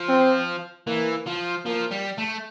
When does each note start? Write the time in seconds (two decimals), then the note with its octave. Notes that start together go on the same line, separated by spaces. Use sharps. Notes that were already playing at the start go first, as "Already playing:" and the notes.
Already playing: F3
0.09 C4
0.87 E3 A#3
1.26 F3
1.65 F3 A#3
1.91 G3
2.18 A3